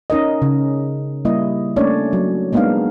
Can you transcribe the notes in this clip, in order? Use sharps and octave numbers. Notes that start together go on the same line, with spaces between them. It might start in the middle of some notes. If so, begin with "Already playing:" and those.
C#4 D#4 A#4 D#5
C#3
G3 A#3 E4 D#5
A3 A#3 C#4 D4 C#5 D5
F#3
G#3 A#3 B3 D4 D#4 F5